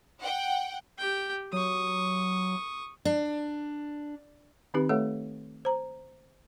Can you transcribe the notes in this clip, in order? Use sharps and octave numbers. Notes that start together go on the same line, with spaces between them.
F#5 G5
G4 G5
F#3 C#6 D#6
D4
D#3 C4 D#4 G4 B4
A3 A4 B4 C#5 E5 F#5
C5 A#5